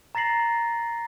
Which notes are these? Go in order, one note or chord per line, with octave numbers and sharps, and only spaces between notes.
A#5 A6 A#6 C7 F#7